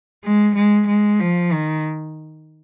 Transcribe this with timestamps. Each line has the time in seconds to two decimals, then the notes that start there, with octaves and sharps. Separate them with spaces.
0.24 G#3
0.56 G#3
0.87 G#3
1.20 F3
1.52 D#3